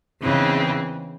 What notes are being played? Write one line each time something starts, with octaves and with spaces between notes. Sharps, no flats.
E2 C#3 E3 C4 D#4